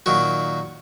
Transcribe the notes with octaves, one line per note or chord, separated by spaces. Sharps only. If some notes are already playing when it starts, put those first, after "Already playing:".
A#2 D#3 F#3 F#4